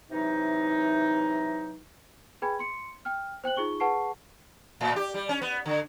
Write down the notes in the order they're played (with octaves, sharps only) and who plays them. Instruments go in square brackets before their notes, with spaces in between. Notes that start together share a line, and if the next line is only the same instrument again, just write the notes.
[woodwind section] C3 E3 F#3 D#4
[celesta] G#4 B4 G5 G#5 B5 G#6
C6 C#7
G5 F6
C5 G5 F#6 F#7
D#4 F4 G#4 C#6 G7
G#4 B4 F#5 A5 C#6 C7
[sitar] A2
G4
G3
C#4
B3
D3